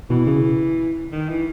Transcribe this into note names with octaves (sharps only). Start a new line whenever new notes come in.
B2 E3
C#3
D#3
E3